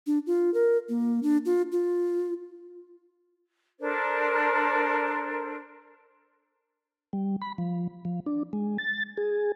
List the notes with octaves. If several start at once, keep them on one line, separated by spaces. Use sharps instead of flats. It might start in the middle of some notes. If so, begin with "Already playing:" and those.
D4
F4
A#4
A#3
D4
F4
F4
D4 A4 A#4 C5
G3
B5
F3
F3
D4
G#3
A6
G#4